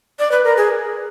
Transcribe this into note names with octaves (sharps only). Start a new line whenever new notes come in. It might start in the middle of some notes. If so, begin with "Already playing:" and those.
D5
B4
A#4
G#4